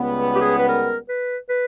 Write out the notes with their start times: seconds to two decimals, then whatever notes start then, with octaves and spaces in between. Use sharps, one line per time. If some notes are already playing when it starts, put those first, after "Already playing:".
Already playing: C#2 C#3 G3 B3
0.35 G4
0.41 G#4
0.59 B4
0.69 A#4
1.09 B4
1.49 B4